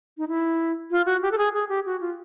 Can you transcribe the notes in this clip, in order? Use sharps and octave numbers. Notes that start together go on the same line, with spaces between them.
D#4
E4
F4
F#4
G4
A4
G#4
G#4
G4
F#4
F4